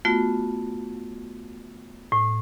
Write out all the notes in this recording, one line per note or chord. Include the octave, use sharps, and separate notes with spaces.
A3 B3 F4 F#4
A2